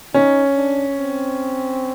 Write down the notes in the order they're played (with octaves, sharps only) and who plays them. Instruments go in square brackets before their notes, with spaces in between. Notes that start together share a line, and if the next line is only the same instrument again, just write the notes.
[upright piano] C#4 [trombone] D#4
[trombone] D4
C4